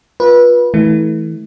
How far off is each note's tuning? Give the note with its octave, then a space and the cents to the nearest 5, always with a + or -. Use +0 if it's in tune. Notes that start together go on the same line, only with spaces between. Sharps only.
F4 +20 B4 -25
E3 -30 A3 -20